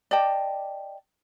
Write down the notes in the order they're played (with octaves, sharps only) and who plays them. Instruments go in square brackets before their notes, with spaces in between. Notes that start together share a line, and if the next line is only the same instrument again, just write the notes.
[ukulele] D5 D#5 G5 A5